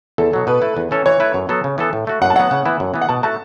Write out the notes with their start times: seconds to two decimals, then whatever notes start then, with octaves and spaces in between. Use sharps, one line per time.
0.18 E2 A4
0.33 B2 F#3
0.47 B2 B4
0.62 A3 E4
0.77 E2
0.91 E3 C#4 A4 C#5
1.06 E3 C#5
1.20 A3 E4 B4
1.34 F#2
1.49 F#3 B3 A4
1.64 C#3
1.78 E3 B3 A4
1.93 A2
2.07 A3 F#4
2.22 F#2 F#5
2.30 A5
2.36 F#3 B3 F#5
2.51 C#3
2.65 E3 B3 E4
2.80 F#2
2.94 E3 B3
3.02 F#5
3.09 B2 A5
3.23 A3 F#4 A5